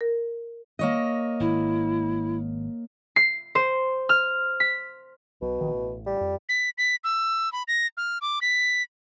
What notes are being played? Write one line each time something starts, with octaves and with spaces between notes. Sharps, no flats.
A#4
A#3 C#5 D#5
G#1 E4
C7
C5
F6
B6
B1 B2
A#1 D#3
A1
G3
F2
B6
B6
E6
B5
A#6
F6
D6
B6